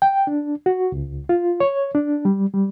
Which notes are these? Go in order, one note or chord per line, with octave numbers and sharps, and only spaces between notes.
G5
D4
F#4
C#2
F4
C#5
D4
G3
G3